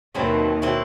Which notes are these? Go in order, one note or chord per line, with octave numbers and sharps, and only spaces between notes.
D#2 B2 D#3 F#3 C4 E4
B2 F#3 C4 E4